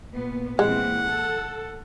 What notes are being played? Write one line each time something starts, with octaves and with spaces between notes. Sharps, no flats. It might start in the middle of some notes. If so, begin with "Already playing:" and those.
A#2 B3
A#2 E3 G#3 C4 F#5
A4